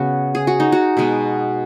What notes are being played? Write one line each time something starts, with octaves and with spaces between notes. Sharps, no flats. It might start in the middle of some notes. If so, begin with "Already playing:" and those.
Already playing: C#3 B3 F#4
G#4
F#4
D#4
F#4
B2 G#3 B3